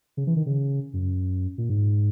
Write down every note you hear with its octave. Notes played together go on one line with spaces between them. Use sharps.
C#3
E3
D#3
C#3
F#2
A#2
G#2